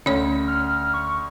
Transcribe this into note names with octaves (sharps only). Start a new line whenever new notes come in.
D2 C#4 C#5
F6
C#6